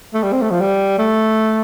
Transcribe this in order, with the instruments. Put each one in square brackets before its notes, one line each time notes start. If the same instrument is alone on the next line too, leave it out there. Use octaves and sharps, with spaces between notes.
[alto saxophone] A3
G3
C4
A3
F3
G3
A3